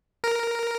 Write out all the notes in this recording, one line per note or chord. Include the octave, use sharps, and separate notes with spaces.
A#4